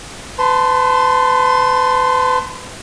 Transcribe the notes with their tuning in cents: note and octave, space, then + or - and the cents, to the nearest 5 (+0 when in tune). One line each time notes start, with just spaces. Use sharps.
B4 +35 A5 +5 C6 +0